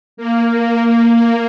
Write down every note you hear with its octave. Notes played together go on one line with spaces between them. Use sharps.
A#3